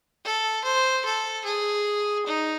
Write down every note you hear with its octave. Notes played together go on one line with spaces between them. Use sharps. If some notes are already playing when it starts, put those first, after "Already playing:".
A4
C5
A4
G#4
D#4